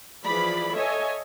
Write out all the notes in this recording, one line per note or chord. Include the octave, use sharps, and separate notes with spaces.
E3 F3 G#4 D5 B5
A4 C#5 D#5 E5 G#5